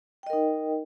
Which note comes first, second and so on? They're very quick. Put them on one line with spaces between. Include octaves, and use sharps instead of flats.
G5 D#5 A#4 D#4